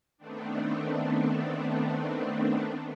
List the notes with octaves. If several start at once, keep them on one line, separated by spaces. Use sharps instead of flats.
D#3 A3 B3 C4 D4